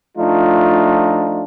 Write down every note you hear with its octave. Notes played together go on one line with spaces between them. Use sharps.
F3 A3 D4 D#4 F4